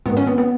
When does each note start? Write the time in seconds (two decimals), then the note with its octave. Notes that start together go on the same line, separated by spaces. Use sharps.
0.06 G#2 D#3 B3
0.17 C#4
0.27 B3
0.38 B3